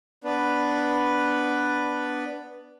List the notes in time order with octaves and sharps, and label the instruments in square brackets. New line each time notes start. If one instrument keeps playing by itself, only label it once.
[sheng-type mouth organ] B3 D4 B4